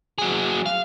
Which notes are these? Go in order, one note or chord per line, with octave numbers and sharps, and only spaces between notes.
F#3 G#4
F5